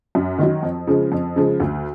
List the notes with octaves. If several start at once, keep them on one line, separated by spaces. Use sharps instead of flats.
F#2
D#3 F#3
F2
C#3 F3 G#3
F2
C#3 F3 G#3
D2